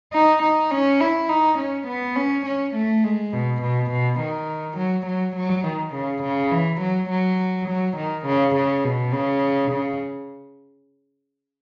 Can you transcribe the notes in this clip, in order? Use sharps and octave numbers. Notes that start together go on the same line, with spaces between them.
D#4
D#4
C#4
E4
D#4
C#4
B3
C#4
C#4
A3
G#3
B2
B2
B2
D#3
F#3
F#3
F#3
D#3
C#3
C#3
E3
F#3
F#3
F#3
D#3
C#3
C#3
B2
C#3
C#3